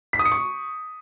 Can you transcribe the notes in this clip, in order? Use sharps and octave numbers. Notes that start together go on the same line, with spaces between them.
B6
D#6
C#7
C#6